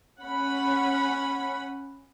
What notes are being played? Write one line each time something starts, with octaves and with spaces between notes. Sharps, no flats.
C#4 F#5 B5